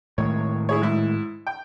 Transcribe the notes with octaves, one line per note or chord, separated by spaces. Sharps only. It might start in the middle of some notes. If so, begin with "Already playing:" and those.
A2 D#3 G#3 C#5
E4 G#4 C#5
G#2 E4
G5